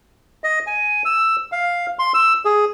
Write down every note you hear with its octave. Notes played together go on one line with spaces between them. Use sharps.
D#5
G#5
E6
F5
C6
E6
G#4